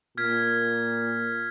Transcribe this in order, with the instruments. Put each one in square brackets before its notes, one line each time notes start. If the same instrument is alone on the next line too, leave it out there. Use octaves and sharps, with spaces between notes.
[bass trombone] A#2 [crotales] F6 G#6 B6